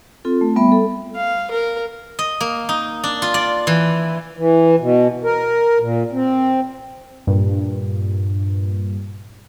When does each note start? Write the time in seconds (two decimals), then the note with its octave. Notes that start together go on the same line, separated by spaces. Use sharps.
0.25 C4 F4 A4
0.41 A3
0.56 G3 B3 E5 B5
0.72 A4
1.15 F5
1.51 A#4
2.19 D#5
2.41 A#3
2.69 D#4
3.04 D4
3.22 F4
3.34 D5
3.67 E3
4.37 E3
4.80 B2
5.24 A#4
5.80 A#2
6.12 C4
7.27 G2 A#2